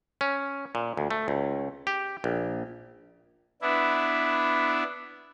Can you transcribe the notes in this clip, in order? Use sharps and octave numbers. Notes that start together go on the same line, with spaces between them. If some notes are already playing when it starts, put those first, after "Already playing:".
C#4
A#2
D2
A3
C#2
G4
A#1
B3 D4 E4